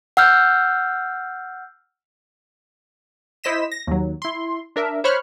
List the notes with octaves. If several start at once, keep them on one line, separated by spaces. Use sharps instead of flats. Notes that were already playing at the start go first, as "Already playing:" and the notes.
F#5 E6 F6 G6
E4 C5 D#5 B6 E7
A#6
D#2 F#3
E4 C6
D4 A#4 E5
C5 C#5 B5 C#6 F6 F#6